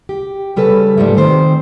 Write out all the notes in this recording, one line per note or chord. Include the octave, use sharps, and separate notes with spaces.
G4
C#3 G3 C#4 A4 B4
G#2 F3 G3 A3
D#3 C4 C5